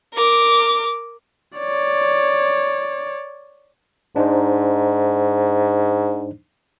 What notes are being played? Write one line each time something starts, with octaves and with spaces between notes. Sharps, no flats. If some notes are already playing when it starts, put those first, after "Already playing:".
A#4 D6
C#5 D5
G#2 D4 D#4 C5